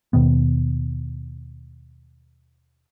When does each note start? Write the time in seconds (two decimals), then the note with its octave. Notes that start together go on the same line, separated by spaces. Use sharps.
0.13 D#2 B2 D#3 B3